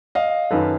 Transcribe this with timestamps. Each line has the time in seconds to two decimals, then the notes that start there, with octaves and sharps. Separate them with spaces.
0.15 D#5 F5
0.51 F#2 D#3 F#3 A4 B4